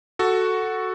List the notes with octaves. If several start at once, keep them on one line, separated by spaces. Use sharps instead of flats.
F#4 A4